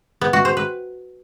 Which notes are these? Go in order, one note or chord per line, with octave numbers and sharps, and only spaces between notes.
B3
F#4
C5
B4